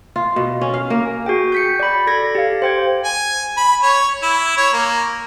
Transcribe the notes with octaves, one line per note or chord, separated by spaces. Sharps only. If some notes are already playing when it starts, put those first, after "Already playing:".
F4
B2
C#4
F5
A#3
F#4 G#4 G5
G6 B6 C#7
D5 B5
A4 G#6 A#6
G4 F5
C5 G5 G#6
G#5
B5
C#5
E4
C#5
A#3